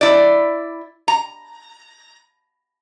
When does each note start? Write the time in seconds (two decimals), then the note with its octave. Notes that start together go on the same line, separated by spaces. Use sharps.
0.01 E4 D5
1.08 A#5